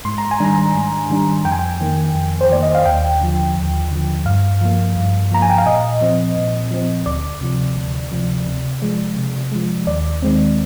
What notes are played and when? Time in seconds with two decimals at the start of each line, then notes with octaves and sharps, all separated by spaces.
0.05 G#2 C6
0.18 A#5
0.31 G#5
0.40 D#3 G3 D4 A#5
0.75 G#2
1.10 D#3 G3 D4
1.45 F2 G5
1.52 G#5
1.59 G5
1.81 D#3 A#3
2.15 F2
2.41 C5
2.50 D#3 A#3 D5
2.63 D#5
2.75 F5
2.86 D#2 G5
3.21 D3 F3
3.56 D#2
3.91 D3 F3
4.25 G2 F5
4.61 F3 A#3
4.96 G2
5.31 F3 A#3 A#5
5.42 G#5
5.50 G5
5.58 F5
5.66 A#2 D#5
6.01 F3 C4
6.37 A#2
6.71 F3 C4
7.06 D2 D5
7.41 C3 F3
7.77 D2
8.12 C3 F3
8.47 C3
8.82 F3 G#3
9.16 C3
9.52 F3 G#3
9.87 D#2 D5
10.22 D#3 G#3 C4